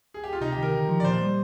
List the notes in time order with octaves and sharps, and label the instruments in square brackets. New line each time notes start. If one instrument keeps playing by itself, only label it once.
[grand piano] G#4
G4
F4
[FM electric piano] C3 [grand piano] D#4
[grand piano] G4
[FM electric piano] D#3 [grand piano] A#4
[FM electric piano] D3
F3
[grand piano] D5
[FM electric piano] A#2 [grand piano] C5
[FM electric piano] G3